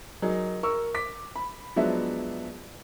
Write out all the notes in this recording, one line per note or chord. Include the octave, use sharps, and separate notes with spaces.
F#3 D#4 G#4 A#4
A#4 C#6 E6
D6 B6
B5
F3 F#3 G#3 B3 D4 E5